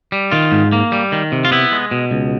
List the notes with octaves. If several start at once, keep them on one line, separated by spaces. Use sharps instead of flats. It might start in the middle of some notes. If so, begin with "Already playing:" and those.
G3
D#3 F4
G#2
A#3
G3
D#3
C3
F4
B3 E4
G#3
B2
C#2